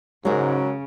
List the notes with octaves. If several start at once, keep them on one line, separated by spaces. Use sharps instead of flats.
G#2 C#3 F#3 G#3 A#4